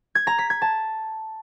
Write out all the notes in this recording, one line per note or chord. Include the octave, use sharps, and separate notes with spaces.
G#6
A#5
B6
G#6
A5